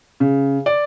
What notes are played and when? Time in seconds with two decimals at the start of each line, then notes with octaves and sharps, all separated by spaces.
0.20 C#3
0.66 D5